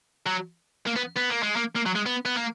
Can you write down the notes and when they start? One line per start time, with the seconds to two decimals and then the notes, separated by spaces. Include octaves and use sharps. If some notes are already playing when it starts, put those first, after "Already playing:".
0.26 F#3
0.86 A#3
0.96 B3
1.16 B3
1.30 A#3
1.43 G#3
1.57 A#3
1.76 A#3
1.86 F#3
1.96 G#3
2.06 B3
2.26 B3
2.36 A#3